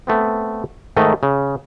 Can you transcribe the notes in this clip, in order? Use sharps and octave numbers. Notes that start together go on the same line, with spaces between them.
A3 B3 C4
G#2 D#3 A3 D#5
C#3